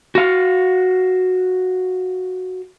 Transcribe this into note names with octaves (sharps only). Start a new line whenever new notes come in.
F#4 F5